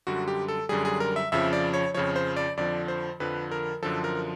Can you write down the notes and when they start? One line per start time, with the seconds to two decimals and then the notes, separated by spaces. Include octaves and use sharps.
0.07 F#2 D3 G3 F#4
0.28 G4
0.48 A4
0.69 F#2 D3 G3 G#4
0.85 G#4
1.00 A#4
1.16 E5
1.32 F2 C#3 F3 E5
1.53 D5
1.74 C#5
1.94 F2 C#3 F3 C#5
2.16 C5
2.37 D5
2.57 F2 D3 F3 D5
2.88 C5
3.20 F2 D3 F3 B4
3.51 A#4
3.82 F#2 D3 F3 A4
4.04 A#4